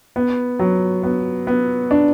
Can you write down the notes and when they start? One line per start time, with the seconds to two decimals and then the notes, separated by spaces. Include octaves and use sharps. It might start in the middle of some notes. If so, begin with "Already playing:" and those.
0.16 B3
0.59 F#3
1.03 B3
1.47 B3
1.91 D4